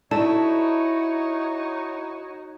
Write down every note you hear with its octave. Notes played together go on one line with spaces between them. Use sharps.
D#4 E4 F#4 A4 C#5 D5 A5